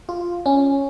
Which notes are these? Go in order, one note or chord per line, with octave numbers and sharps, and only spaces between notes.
F4
C#4